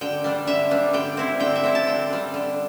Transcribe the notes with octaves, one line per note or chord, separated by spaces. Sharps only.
D3 G5
G3 D4
D3 E5
G3 D4
D3 G5
C4 E4
D3 G5
E5
C4 E4 G5
A5
D3 G5
G3 D4
D3